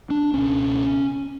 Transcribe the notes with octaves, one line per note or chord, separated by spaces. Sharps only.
D4
C#2 B2 C#4